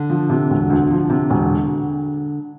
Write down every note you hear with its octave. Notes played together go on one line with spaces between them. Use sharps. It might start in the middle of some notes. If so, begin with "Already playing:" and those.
Already playing: D3
F3
C3
E1
D2
F3
C3
E1